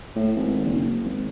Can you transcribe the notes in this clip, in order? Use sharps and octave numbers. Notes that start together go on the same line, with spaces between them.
A2
G#1
F#1
G#1